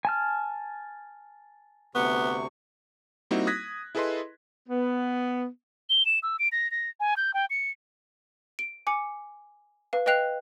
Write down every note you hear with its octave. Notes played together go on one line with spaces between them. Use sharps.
G#5 A5 F6
D2 C3 B3 C#6
G3 A#3 C4 D#4 E4 F#4
D#6 F#6 G#6 A#6 B6
E4 G#4 A4 B4 D#5 C6
B3
G7
E7
E6
D7
A#6
A#6
G#5
G6
G5
C#7
D7
G#5 D6 C#7
B4 F5
B4 D#5 G5 F#6 C7 F7